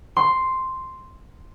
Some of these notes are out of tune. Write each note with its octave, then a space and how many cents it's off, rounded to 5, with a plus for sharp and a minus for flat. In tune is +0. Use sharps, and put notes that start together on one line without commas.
C6 +0